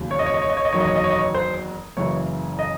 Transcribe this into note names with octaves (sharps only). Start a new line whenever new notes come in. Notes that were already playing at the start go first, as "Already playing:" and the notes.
Already playing: E1 D#2 C#3 F#3
C#5
D#5
C#5
D#5
C#5
D#5
C#5
D#5
F#1 E2 D#3 F#3 C#5
D#5
C#5
D#5
C#5
D#5
C#5
C5
F#1 F#2 C#3 E3 C#5
D#5